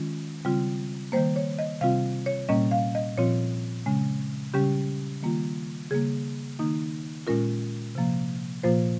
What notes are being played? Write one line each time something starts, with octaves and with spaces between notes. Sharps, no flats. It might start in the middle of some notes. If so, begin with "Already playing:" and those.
Already playing: D#3 G#3 C#4 F4
C#3 G3 C4 F4
D#3 G3 A#3 C5
C#5
D#5
C3 G3 C4 F4 F5
C#5
A#2 G3 A#3 C#4 D#5
F5
D#5
A#2 F3 C4 F4 C#5
C#3 G#3 C#4
C#3 G3 C#4 G4
D#3 G3 A#3 F4
C#3 G3 A#3 G#4
D#3 A#3 D#4
A#2 G#3 C#4 F4 A#4
C3 F3 A#3
A#2 F3 A#3 F4 C5